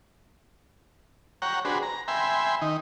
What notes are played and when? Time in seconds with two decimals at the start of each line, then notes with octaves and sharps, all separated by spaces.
1.42 C#5 F#5 G5 A#5
1.65 D4 F#4 G#4 B4 C5
1.83 A#5
2.08 E5 G5 G#5 B5 C6
2.62 D#3 D#4